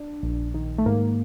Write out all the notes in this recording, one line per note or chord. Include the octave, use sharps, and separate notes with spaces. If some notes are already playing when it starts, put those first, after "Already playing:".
Already playing: D4
A#1
D#3
A3
G#2 A#3